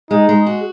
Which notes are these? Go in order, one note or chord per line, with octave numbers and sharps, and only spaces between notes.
G#3 D#4
G#3
F#4